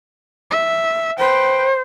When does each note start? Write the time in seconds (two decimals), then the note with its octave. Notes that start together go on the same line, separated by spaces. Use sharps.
0.51 E5
1.18 B4 C5 G5